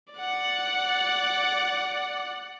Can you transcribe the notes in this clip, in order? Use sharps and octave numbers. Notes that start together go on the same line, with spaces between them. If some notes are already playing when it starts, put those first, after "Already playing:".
D5 F#5